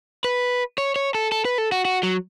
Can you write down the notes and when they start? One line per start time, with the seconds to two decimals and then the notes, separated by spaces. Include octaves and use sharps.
0.24 B4
0.78 C#5
0.96 C#5
1.15 A4
1.32 A4
1.45 B4
1.58 A4
1.72 F#4
1.85 F#4
2.03 F#3